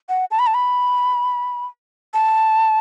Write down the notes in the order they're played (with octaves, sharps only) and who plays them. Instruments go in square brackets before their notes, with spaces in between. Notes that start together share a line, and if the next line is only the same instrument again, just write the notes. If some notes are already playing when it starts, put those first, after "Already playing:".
[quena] F#5
A5
B5
A5
B5
A5